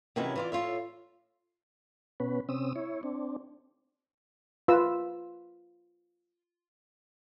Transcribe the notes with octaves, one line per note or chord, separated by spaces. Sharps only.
C3 D#3 E3 F#3 C#4 E4
E3 F4 D5
A2 F4 C#5 E5
B2 B3 C#4 B4
C3 C4 C#4 D#6 E6
E4 C#5
C4 D4
F4 B4 E6